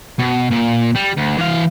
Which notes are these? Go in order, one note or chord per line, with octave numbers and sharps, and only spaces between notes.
B2
A#2
G3
D2
E3 F5